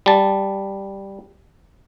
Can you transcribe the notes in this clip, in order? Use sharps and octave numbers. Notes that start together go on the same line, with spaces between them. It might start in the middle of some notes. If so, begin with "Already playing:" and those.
G3 A5